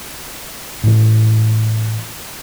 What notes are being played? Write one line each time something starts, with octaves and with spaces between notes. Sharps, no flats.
A2 E3